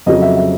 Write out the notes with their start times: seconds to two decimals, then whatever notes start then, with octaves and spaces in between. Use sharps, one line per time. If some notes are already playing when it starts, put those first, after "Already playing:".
0.06 F2 C#3 F#3 D#5
0.22 E5
0.37 E5